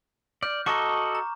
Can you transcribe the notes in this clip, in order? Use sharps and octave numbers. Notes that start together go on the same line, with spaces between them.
D5 F6 G6
F#4 A4 D#5 A#5 C#6 D6
A#5